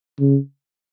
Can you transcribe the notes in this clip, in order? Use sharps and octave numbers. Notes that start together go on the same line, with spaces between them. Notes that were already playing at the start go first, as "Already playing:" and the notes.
C#3